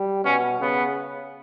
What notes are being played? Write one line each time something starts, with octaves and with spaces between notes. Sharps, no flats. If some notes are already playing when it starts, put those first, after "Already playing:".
Already playing: G3
B2 C#4
C#3 B3